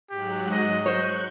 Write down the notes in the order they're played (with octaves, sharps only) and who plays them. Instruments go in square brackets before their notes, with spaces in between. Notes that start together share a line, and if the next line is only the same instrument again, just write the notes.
[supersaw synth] G#2 F#3 F#6 [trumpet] G4
[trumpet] D#5
[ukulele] C5 C#5 [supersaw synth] C#6 F#6 G6